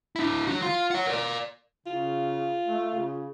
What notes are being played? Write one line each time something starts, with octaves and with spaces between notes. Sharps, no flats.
D4 E4
F#3 F#4
F4
C#5 F#5
A#4 D5
C#3 F4
A3
C#3